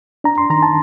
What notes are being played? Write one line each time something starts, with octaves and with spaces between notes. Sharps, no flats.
D4 A#5
C6
D#3 A#5
A5